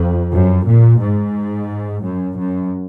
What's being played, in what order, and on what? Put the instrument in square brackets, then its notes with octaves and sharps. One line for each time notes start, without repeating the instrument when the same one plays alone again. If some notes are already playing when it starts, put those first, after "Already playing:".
Already playing: [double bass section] F2
F#2
A#2
G#2
F#2
F#2